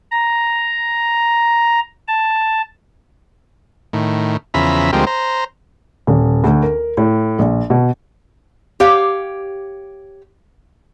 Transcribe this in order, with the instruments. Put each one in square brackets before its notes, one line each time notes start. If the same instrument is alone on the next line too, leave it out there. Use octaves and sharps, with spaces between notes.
[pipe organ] A#5
A5
[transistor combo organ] A2 D#3
E2 C#3 F3 E5 A#5 B5
D2 F3 G#3 C4 G4 A#4
C5 A#5
[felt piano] D#1
D2
A#4
A2
A#1
B2
[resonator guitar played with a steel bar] G4 C#5 F5